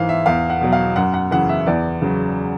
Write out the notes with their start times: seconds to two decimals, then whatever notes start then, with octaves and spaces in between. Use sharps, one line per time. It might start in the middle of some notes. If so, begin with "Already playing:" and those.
Already playing: G#2 E3 C5 F5
0.09 E5
0.26 E2 F5
0.50 F#5
0.61 B2 F#3
0.73 F5
0.96 F#2 F#5
1.14 F#5
1.31 C#3 E3 F#5
1.49 E5
1.66 E2 D5
2.02 C#3 F#3